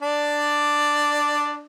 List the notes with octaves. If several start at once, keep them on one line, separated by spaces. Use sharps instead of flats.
D4 D5